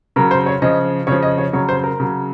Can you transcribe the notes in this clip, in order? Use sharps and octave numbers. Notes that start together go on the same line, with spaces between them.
C#3 F#3 A#4
C5
C#5
C#3 F3 D#5
C#3 F3 C#5
D#5
C#5
C#3 F#3 C#5
C5
A#4
C#3 F#3